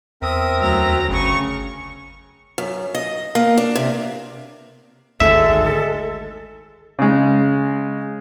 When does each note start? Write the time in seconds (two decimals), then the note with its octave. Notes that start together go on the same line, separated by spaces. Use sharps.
0.22 E2 C4 A#4 E5 D#6
0.59 D2 F#3 A#5
1.09 G1 C#3 C#6
2.58 F#2
2.95 D#5
3.35 A#3
3.58 D4
3.75 C3
5.20 G#1 D2 G#2 G#3 A4 E5
6.99 C#3 G#3